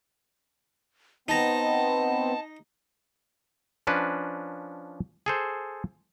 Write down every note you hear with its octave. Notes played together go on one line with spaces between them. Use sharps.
B3 C4 D#4 D#5 A5 A#5
F3 C#4 D4 B4
G#4 A4 C5